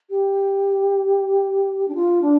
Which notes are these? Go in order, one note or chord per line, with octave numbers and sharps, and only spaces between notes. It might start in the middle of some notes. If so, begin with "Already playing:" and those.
G4
D4
F4
D4